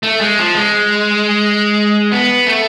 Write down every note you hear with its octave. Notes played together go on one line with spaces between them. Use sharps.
A3
G#3
F3
G#3
B3
A3